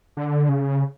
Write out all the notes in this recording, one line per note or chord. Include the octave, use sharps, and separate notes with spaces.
D3
C#3